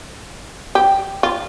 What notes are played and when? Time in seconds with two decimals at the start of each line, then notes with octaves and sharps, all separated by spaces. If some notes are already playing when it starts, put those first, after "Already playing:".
0.75 G4
1.23 F4